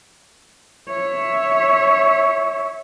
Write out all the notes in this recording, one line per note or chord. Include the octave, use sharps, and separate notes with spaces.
C#5 E5